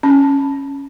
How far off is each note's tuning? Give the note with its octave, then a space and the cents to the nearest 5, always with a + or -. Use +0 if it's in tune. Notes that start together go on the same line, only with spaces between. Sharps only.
C#4 +0 A5 +0